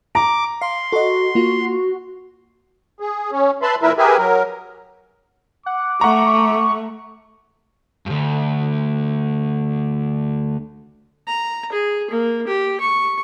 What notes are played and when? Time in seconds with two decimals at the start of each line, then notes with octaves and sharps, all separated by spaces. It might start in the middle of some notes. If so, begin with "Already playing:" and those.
0.15 A#5 D6
0.62 F5 C6
0.92 F#4 A4 D#5
1.35 A#3 F4
3.00 G#4
3.31 C#4
3.62 B4 E5 A5 B5 C6
3.82 A#2 E3 E4 A#4 B4 E5
3.98 G4 G#4 A#4 B4 E5 G#5
4.17 F#3 A#4
5.66 F#5 D6
6.01 A3 F#5 A#5 C#6
8.06 D2 G2
11.27 A#5
11.72 G#4
12.10 A#3
12.48 G4
12.80 C#6